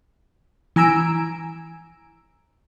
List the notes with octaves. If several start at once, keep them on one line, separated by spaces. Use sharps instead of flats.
E3 G#5 A#5 E6 D7